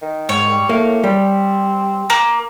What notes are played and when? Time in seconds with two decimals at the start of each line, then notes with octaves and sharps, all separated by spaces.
0.02 D#3
0.29 G#2 C#5
0.50 G3
0.69 A2 A#3
1.04 G3 C4
2.10 A#3